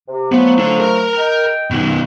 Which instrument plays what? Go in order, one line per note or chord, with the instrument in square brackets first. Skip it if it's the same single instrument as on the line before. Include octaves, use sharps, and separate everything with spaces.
[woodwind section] C3
[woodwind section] F3 F#3 A3 [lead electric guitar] B3
[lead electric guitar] D4 A4
A#4 A#5
[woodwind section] D#5 G5
[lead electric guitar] B2 D#3